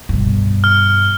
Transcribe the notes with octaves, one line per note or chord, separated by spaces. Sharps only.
G2 B2
F6